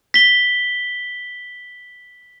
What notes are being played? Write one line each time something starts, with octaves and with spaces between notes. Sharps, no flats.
B6 G7